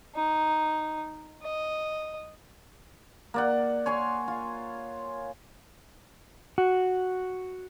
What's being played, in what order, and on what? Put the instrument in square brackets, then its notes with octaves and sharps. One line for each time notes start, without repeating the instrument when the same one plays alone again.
[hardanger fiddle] D#4
D#5
[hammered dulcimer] A#3 D5 F#5
C#5 G#5 C6
F4
[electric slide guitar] F#4